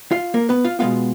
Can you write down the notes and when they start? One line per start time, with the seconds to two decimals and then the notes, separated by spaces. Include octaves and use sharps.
0.11 F4 F5
0.34 A#3 A#4
0.49 B3 B4
0.65 F4 F5
0.79 B2 G#3 B3 F4 F5